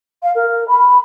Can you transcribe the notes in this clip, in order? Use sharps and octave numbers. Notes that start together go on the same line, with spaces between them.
F5
A#4
B5